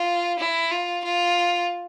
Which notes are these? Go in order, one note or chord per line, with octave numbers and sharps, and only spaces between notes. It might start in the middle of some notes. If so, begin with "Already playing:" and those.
Already playing: F4
E4
F4
F4